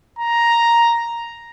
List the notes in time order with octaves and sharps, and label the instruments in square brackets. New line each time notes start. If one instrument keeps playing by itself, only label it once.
[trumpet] A#5